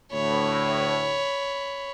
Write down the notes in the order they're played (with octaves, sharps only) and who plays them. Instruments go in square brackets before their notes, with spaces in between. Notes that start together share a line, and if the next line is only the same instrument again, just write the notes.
[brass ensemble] D2 A2 [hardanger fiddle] C#5 B5